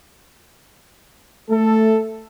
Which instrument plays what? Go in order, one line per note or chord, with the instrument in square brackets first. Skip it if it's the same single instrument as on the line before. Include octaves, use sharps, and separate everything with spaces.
[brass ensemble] A3 A4